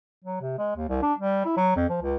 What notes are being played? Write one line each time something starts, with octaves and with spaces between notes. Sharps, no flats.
F#3
C3
G#3
D#2
C2
D4
G3
E4
F#3
F2
F3
C#2